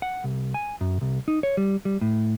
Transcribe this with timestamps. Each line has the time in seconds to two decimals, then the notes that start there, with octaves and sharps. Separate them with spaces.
0.02 F#5
0.24 C2
0.54 G#5
0.81 F#2
1.01 C2
1.28 D#4
1.43 C#5
1.57 G3
1.85 G3
2.01 A2